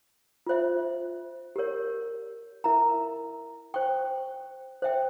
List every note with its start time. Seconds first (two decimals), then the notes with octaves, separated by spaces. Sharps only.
0.47 F4 C5 E5
1.56 G4 A#4 C#5
2.64 E4 A#4 E5 A#5
3.74 C5 G5 C#6
4.82 C5 E5 G5